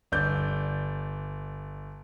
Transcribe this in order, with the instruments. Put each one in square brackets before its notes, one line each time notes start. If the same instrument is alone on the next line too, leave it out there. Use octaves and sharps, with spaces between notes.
[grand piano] G1 D5 G6